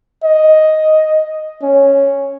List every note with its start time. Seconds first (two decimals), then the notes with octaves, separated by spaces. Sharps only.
0.24 D#5
1.62 C#4